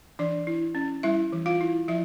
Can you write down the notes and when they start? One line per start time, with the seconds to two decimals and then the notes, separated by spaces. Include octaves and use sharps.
0.19 E3 D4 D5
0.47 E4
0.75 C#4
1.03 G3 E4 E5
1.32 E3
1.46 F4 F5
1.61 E4
1.88 F3 E4 E5